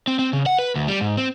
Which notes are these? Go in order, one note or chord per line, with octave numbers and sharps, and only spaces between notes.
C4
C4
C#3
F#5
B4
D2
G3
G#2
C4